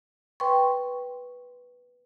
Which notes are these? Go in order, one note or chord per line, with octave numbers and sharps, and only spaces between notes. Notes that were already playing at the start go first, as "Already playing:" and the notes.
B4 G5 C6 C#6